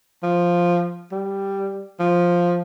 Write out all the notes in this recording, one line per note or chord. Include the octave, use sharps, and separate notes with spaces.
F3
G3
F3